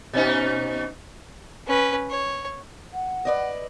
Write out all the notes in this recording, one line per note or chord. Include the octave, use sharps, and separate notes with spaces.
B2 C#4 D#4
C#4 B4
C#5
F#5
B4 D5 D#5